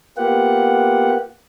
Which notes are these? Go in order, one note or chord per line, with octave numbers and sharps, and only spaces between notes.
A#3 B3 F4 G4 F#5